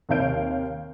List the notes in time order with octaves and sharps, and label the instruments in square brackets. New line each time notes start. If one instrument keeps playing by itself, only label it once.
[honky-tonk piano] D#2 C3 C#5 F5 G6 D7